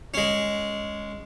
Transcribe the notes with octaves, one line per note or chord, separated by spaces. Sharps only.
G#3 C#4